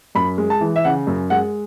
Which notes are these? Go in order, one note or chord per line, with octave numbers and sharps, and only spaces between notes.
F#2 B5
G#3
A5
E3
E5
C#3 F#5
F#2
G#3 F#5